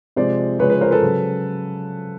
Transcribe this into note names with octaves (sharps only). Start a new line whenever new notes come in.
C3 F3 G#3 C5 D5
C#3 F3 G#3 B4 C#5
B4 C#5
A#4 C5
A4 B4
C#3 F#3